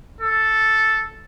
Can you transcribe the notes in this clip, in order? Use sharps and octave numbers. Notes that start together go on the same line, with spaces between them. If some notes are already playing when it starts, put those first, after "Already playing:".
A4